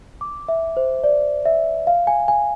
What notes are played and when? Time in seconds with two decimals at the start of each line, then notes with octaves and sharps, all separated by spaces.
0.21 D6
0.48 E5
0.77 C5
1.04 D5
1.46 E5
1.87 F5
2.07 G#5
2.28 G#5